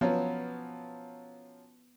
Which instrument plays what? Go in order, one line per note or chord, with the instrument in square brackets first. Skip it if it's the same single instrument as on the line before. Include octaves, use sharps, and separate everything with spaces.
[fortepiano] F3 F#3 C#4 [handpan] B3